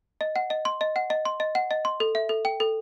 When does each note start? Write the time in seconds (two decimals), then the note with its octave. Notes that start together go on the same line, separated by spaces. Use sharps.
0.21 D#5
0.36 F#5
0.50 D#5
0.65 C6
0.81 D#5
0.96 F#5
1.10 D#5
1.25 C6
1.40 D#5
1.55 F#5
1.71 D#5
1.85 C6
2.00 A4
2.15 E5
2.29 A4
2.45 G5
2.60 A4